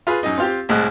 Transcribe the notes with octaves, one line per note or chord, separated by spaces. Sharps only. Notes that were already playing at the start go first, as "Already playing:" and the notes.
F4 G#4 B4
F#2 D#4
C4 F4 G4
C2 A2 G#3 D#6 F#6